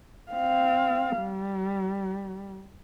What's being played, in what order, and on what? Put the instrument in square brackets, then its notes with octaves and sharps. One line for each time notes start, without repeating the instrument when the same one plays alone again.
[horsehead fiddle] C4 F5
G3